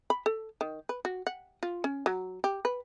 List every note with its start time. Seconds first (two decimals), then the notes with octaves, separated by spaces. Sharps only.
0.10 B5
0.26 A4
0.61 D#3
0.89 B4
1.05 F#4
1.27 F#5
1.63 F4
1.84 C#4
2.06 F#3
2.44 G4
2.65 B4